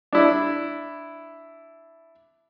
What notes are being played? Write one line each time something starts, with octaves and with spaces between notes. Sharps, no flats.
D4 E4